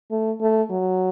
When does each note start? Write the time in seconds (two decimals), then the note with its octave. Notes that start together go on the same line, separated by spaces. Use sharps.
0.11 A3
0.41 A3
0.70 F#3